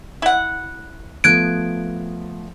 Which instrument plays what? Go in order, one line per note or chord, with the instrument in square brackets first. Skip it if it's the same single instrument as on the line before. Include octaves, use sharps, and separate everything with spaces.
[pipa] E4 F#5
[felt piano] F3 A3 B3 [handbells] F#6 G#6 D7